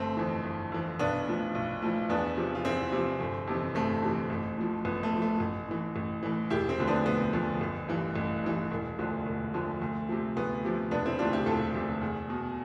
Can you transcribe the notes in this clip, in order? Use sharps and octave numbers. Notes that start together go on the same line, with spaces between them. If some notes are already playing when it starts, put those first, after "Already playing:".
Already playing: G1 A3 C4
F2 E3
G1
F2 E3
B1 B3 D4
A2 F3
B1
A2 F3
E2 B3 D4
C3 F3
F4
E2 C4 E4
C3 F3
G1
F2 C3 E3
G1 A3 C4
F2 C3 E3
A1
A2 F3
A1 B3
A3
A2 F3
A3
A1
A2 E3
A1
A2 E3
E1 E4 G4
C4 E4
D2 D3 F3
B3 D4
E1 B3
D2 D3 F3
A1
G2 E3
A1
G2 E3
E1
D2 D3 F3
E1
D2 D3 F3
D2
C3 F3
D2 B3
C3 F3
E1 B3 D4
C4 E4
D2 C3 D4 F4
E4 G4
E1 F4 A4
D2 C3
E2
B2